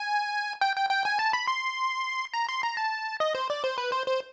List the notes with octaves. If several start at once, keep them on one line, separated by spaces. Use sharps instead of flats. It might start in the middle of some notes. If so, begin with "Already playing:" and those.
Already playing: G#5
G5
G5
G5
G#5
A5
B5
C6
A#5
C6
A#5
A5
D#5
C5
D5
C5
B4
C5
C5